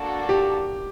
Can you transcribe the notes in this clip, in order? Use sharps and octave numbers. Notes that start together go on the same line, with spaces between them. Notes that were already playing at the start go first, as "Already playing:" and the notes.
Already playing: A#3 D4 F#4 A4
G4